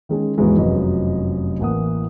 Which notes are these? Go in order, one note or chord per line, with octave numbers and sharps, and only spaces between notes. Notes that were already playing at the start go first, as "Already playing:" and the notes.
D#3 G#3 C#4
D#2 G#2 B2 E3 G#3 B3
F1 F#2 F3 F#4 B4 D#5
A1 E3 A#3 F#5 D#6